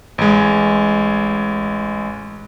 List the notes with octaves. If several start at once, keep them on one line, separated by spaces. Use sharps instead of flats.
A1 G#3